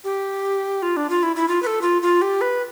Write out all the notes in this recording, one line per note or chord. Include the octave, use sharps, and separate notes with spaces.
G4
F4
D4
F4
E4
E4
F4
B4
A4
F4
F4
G4
B4